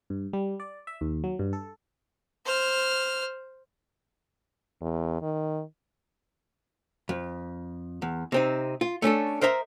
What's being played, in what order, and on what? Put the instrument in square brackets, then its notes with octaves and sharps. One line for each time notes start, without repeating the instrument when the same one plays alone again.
[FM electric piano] G2
G3
D5
E5
D#2
F#3
G2
A4
[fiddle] C5 F6
[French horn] E2
D#3
[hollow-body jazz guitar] F2
E2
C3 C4 D#4
F4
A3 C#4 D4 A4
A#4 C5 D#5 E5 A#5